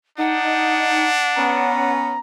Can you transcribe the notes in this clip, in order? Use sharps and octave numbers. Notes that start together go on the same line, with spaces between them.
D4 D#4 F#5
B3 C#4 A#5